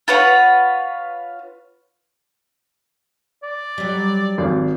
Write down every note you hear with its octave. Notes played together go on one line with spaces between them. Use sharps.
F4 B4 C#5 F#5
D5
F#3 G3
G#1